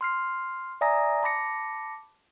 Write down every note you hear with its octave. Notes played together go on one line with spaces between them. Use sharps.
C6 F6 C7
D5 E5 G#5 A#5 D#6 A#6
A5 B5 D6 A#6 C#7